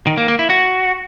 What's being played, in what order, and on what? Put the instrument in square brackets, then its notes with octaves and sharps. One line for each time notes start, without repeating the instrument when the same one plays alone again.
[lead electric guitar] D#3
A#3
A#3
E4
F#4